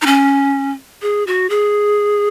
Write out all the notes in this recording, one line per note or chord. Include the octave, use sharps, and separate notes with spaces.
D#4
C#4
G#4
F#4
G#4